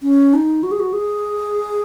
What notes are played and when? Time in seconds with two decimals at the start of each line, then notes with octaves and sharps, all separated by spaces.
0.03 C#4
0.33 D#4
0.63 F#4
0.71 G#4
0.80 F#4
0.93 G#4